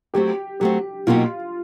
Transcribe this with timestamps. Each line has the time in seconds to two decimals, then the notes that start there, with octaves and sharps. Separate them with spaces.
0.14 F#3 A3 C4 G4
0.60 F#3 A3 C4 G4
1.07 B2 F#3 A#3 D#4 F4 G4